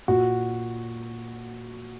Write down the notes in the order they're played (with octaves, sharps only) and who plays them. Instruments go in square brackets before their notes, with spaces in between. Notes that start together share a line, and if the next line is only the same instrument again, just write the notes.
[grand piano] A#2 F#4